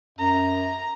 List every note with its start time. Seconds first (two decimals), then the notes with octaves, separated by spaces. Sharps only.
0.19 F#2 A#5